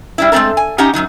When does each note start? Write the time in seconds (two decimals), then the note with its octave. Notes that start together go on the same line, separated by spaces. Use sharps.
0.18 G3 D4 E4
0.32 G#3 A3 C4 A4 A#4
0.57 G#5
0.78 C#4 D#4 G4 D#5 F#5 A#5
0.94 F#2 A#2 F#3 D#4